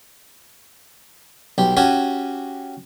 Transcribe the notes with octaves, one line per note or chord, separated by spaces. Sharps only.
B1 G4
C#4 F#4 G4 G#5 A5